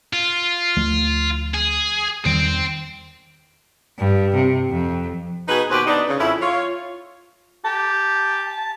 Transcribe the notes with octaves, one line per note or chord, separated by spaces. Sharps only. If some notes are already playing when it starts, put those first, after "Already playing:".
F4
D2 F3 A3
G#4
E2 D#3 G3 C5 G5
G2
C3
F2
B2 D#4 F#4 G#4 B4
D#2 B2 F#4 G4 B4 C5
B3 D4 D#4
C#3
F2 C#4 E4
F4 C#5
G4 A5